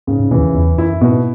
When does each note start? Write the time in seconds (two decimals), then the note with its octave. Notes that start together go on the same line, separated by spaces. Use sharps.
0.07 G#2 C#3
0.20 G#2
0.31 B2 E3
0.37 E2
0.43 F#2
0.54 E2 E4
0.78 F#2 E4
1.01 G#2 B2